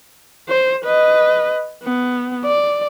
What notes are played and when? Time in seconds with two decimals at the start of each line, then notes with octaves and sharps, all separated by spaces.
0.49 C5
0.85 B4 D#5
1.84 B3
2.45 D5